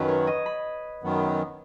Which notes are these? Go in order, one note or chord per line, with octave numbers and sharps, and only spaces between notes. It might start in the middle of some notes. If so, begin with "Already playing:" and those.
Already playing: F#2 D#3 F#3 B4
C#5
D#5
B5
F#2 D#3 F#3 B3